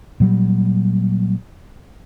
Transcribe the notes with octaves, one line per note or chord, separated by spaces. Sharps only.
A#2 F#3 G3